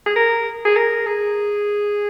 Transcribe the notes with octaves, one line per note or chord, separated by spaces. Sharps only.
G#4
A#4
G#4
A#4
G#4